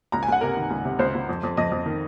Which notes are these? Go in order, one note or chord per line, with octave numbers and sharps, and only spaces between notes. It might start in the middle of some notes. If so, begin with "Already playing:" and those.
C#2 A#5
G#5
C#2 F#5
C3 A#4
D#3
C#2
C3
C#2 C5
C#2
F2
F2
F2 D#5
F2
D#3